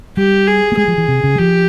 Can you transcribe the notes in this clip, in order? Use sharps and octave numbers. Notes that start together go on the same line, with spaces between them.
G3 G4
G#4
A#3
G#3 G#4
F3
E3
C3
C#3
G3
F3 G4